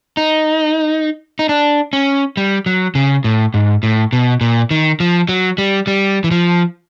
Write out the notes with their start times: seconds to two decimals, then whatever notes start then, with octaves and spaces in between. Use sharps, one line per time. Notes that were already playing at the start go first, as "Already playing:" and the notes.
0.17 D#4
1.39 D#4
1.49 D4
1.93 C#4
2.37 G3
2.66 F#3
2.95 C#3
3.24 A2
3.54 G#2
3.83 A2
4.13 B2
4.41 A#2
4.71 D#3
5.00 F3
5.29 F#3
5.58 G3
5.87 G3
6.24 E3
6.31 F3